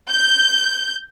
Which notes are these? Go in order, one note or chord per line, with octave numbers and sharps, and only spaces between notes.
G6